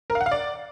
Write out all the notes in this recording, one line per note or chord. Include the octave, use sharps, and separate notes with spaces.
A#4
F5
F#5
F5
D5